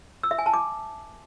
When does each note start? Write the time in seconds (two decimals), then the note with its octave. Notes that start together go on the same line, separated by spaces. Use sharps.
0.23 E6
0.31 E5
0.38 G#5
0.46 A5
0.54 D6